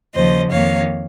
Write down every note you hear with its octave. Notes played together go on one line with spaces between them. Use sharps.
D#2 C#3 F3 C5 D#5
F2 D#3 A#3 C#5 F5